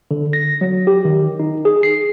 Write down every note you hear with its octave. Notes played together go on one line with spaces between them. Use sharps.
D3
A#6
F#3
G4
D#3
D#4
G#4
C7